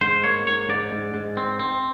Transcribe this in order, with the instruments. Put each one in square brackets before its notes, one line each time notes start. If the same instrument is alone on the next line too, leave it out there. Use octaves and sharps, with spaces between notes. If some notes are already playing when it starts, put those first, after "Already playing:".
[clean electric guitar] G#2 C5
A#3 C#5
G#2 C#5
G#2 D5
G#2
G#2
C4
C4